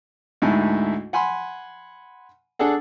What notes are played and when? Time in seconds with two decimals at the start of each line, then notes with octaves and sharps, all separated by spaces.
0.42 D2 G#2 A3 E4 G#5
1.13 F#5 G#5 B5 C6
2.59 D4 G#4 A4 F#5